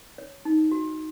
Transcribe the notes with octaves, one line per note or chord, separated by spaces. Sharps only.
C#5
D#4
F#4